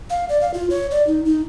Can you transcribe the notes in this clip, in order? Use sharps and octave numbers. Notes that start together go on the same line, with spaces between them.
F5
D5
F5
F4
C#5
D5
D#4
D#4